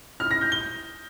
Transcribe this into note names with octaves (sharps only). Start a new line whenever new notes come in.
F6
A#6
G6
G7